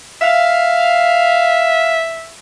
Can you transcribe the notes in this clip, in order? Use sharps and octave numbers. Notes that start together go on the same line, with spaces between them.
E5 F5